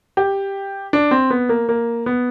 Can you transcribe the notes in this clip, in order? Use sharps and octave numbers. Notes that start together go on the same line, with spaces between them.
G4
D4
C4
B3
A#3
A#3
B3